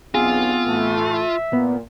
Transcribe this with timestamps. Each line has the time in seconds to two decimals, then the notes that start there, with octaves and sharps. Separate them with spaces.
0.15 B1 E2 B3 C4 F4 G#4
0.66 A2 E3 A3
1.13 E5
1.53 A#2 B3